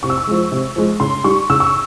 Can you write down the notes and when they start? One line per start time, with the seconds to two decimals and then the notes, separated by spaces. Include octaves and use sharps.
0.03 C3 C#6
0.10 E6
0.18 C#6
0.27 F3 G#3
0.52 C3
0.76 F3 G#3
1.00 C#3 C6
1.24 G3 C#6
1.50 C#3 E6
1.60 C#6